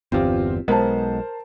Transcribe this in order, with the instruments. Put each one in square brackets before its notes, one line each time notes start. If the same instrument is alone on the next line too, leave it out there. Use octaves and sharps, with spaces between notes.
[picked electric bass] G1 E2 [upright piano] C4 F4 G4
[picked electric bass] B1 G#3 B3 [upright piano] A#4 C5 A5